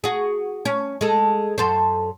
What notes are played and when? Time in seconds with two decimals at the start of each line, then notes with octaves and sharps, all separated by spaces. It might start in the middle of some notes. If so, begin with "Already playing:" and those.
0.04 F#4 G#4
0.65 C#4
1.01 G#3 A4
1.58 F#2 A4 C5